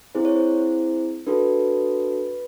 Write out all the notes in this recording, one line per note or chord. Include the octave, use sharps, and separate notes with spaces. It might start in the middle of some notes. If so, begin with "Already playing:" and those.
C4 E4 G#4 C5
C#5
C5
D4 F#4 A4 B4